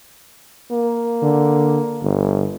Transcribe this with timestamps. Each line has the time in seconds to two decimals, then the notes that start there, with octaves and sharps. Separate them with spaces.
0.72 A#3
1.22 D3
2.03 G1